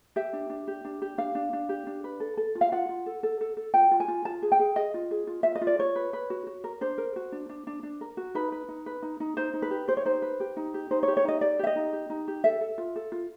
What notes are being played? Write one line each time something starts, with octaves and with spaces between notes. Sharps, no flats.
G4 E5
D4
D4
G4
D4
G4
D4 F5
D4
D4
G4
D4
B4
A4
A4
F4
F5
F4 F#5
F4
A4
A4
A4
A4
F4 G5
F4
G#5
F4
F4 A5
G#4
G5
G#4
G#4 D#5
F4
G#4
F4
F4 E5
D#5
F4
D5
F4 C#5
B4
B4
F#4
F#4
A#4
D4 C5
A#4
F#4
D4
D4
D4
D4
A#4
F#4
D#4 B4
B4
D#4
B4
D#4
D#4
D#4 C5
D#4
B4
G4
G4 C5
C#5
D#4 C5
B4
G4
D#4
G4
D#4 C5
G4 C#5
C#5
D#4 D#5
G4 D5
G4 E5
D#5
D#4
G4
D#4
G4
A4 E5
A4
F4
A4
F4